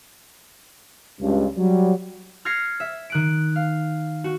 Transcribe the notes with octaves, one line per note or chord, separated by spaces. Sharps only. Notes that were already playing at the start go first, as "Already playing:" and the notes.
C#2 G2
F#3 G3
F6 G#6 A#6 C7 C#7
E5
D#3 F#6 D7
F5
F#4